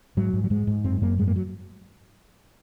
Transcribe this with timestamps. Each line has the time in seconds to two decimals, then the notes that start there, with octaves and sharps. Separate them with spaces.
0.17 G#2 F#3
0.33 G#2
0.44 F#3
0.50 G#2 G#3
0.67 G#2
0.84 F#2 C4
1.02 F#2 A#3
1.18 G#2 G#3
1.27 A#3
1.36 F#3